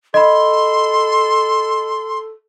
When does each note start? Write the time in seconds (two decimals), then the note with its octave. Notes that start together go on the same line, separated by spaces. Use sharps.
0.14 A4 D#5 B5 C6